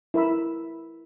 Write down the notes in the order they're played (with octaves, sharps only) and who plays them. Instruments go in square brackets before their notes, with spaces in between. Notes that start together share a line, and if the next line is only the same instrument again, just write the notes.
[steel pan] E4 A#4 E5 B5 E6